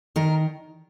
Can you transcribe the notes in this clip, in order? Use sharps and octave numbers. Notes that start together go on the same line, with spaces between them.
D#3 A#4